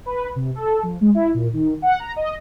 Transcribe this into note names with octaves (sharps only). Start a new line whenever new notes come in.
B4
C3
A4
F3
G#3
E4
A#2
D#3
F#5
A#5
D#5